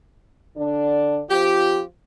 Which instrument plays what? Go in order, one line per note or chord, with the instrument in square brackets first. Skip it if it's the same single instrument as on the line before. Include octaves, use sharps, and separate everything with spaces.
[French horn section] D3 D4
[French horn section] F3 C4 F4 [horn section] G4